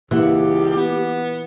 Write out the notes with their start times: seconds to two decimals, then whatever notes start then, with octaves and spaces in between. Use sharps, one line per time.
0.11 C#2 A#2 E3 A#3 G4 F#5
0.76 B3